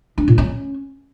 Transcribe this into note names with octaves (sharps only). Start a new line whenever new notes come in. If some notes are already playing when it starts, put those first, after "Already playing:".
D4
A#2
C#4